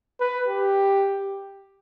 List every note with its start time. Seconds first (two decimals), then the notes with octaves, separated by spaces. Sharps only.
0.21 B4
0.48 G4